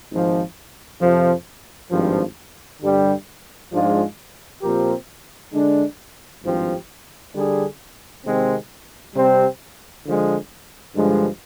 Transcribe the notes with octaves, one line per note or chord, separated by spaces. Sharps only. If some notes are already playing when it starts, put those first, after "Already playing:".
G#1 G#2 F3
F2 C3 F3
G#1 G2 F3
G2 D3 G3
G#2 F3 G#3 D4 F4
A#2 F3 C4 G4 A#4
D3 G#3 D4
G#1 G2 F3 C4 G4
D3 G3 D4 G#4
C3 D#3 G#3 C4
C3 G3 C4
D3 F3 G#3
G2 D3 F3 G#3